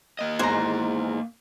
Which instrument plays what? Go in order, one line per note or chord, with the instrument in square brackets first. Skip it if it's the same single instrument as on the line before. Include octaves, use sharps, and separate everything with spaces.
[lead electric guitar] A#3 D#5
[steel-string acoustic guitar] E2 G#2 [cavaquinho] C5 A#5